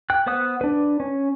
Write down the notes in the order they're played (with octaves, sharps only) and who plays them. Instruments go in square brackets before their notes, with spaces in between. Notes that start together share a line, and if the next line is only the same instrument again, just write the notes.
[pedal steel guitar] G5 F#6
B3 C5 F#5 D#6 F#6
D4 B4
C#4